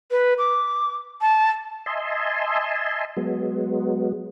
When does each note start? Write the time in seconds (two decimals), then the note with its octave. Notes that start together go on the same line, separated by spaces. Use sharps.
0.11 B4
0.38 D6
1.21 A5
1.86 D#5 E5 G#5 A5 C6
3.17 F#3 G#3 B3